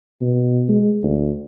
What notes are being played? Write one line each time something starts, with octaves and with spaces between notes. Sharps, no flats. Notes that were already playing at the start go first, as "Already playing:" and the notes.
B2
G#3
D2